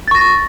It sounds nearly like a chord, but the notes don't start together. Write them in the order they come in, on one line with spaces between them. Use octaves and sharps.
A6 C#6 A#6